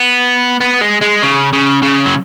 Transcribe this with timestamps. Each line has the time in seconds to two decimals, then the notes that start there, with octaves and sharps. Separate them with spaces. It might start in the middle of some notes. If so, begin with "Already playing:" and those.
Already playing: B3
0.61 B3
0.81 G#3
1.01 G#3
1.22 C#3
1.53 C#3
1.83 C#3
2.06 F#3